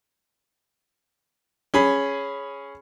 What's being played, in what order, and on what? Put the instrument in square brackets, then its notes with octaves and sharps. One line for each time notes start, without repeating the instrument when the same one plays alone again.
[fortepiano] C#4 G#4 B5